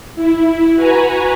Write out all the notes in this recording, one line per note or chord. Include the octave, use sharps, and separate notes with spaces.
E4
F#4 B4 G#5 A#5